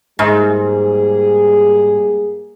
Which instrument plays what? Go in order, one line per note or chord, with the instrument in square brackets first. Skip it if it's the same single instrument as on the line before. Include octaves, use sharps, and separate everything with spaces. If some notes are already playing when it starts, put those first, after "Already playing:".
[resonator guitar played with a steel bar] G#2 [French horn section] G3 A#3 G#4